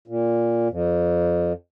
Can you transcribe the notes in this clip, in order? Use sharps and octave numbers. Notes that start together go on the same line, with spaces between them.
A#2
F2